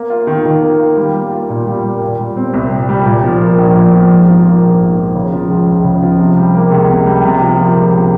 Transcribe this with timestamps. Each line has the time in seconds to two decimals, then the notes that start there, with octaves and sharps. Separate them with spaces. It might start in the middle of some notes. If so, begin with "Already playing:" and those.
Already playing: A#3
0.10 F4
0.27 D#3
0.46 D#3
0.62 A#3
0.80 F4
0.97 G3
1.14 A#3
1.32 F4
1.50 A#2
1.67 G3
1.84 A#3
2.02 A#2
2.19 G3
2.37 C4
2.54 C2
2.71 A#2
2.89 G3
3.06 A#2
3.24 F3
3.41 A#3
3.58 A#1
3.76 A#2
3.93 F3
4.11 G#2
4.28 F3
4.46 A#3
4.63 A#1
4.80 G#2
4.98 F3
5.15 C#3
5.33 F3
5.50 C#2
5.67 C#2
5.85 C#3
6.02 F3
6.19 C3
6.37 G3
6.55 A#3
6.72 C#2
6.89 C3
7.06 G3
7.24 C3
7.41 F3
7.59 A#3
7.76 C#2
7.94 C3